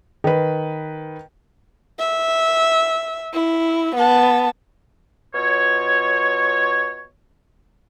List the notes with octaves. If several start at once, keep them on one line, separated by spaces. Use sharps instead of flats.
D#3 B4
E5
E4
B3 A5
B2 F4 C#5